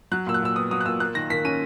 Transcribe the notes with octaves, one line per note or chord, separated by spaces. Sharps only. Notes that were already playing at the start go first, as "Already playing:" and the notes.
F#3 F#6
A#2 E6
F#6
A#2 E6
B3 D#6
F#3 D#6
F#6
A#2 E6
A#3 F#6
D#3 A#6
D#3 B6
C#4 D#7